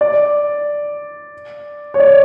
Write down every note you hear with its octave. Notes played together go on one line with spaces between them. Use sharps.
D5
C#5
D5